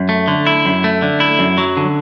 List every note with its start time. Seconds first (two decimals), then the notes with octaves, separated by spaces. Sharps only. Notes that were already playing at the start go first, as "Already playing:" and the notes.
Already playing: F#2
0.09 A3
0.28 D3
0.47 E4
0.65 F#2
0.84 A3
1.02 D3
1.20 E4
1.39 F#2
1.58 F#3
1.77 D3